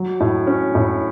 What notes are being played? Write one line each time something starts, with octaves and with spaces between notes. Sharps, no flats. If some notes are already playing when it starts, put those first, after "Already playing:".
Already playing: F#3
A2
C#4
A2